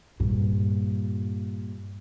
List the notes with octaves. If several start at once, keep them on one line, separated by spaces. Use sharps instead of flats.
G2 A#2